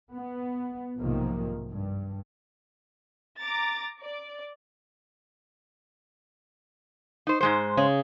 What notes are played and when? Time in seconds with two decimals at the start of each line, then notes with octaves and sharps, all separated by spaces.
0.12 B3
1.00 B1 G#2 C3 D#3 F3 A#3
1.71 G2
3.40 A#5 D6 A6
4.02 D5
7.27 D#4 C5
7.41 G#2 G#3 C5
7.77 C#3 G#4